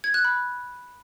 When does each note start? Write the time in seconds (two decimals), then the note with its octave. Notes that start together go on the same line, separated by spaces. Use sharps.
0.04 G#6
0.14 F#6
0.25 B5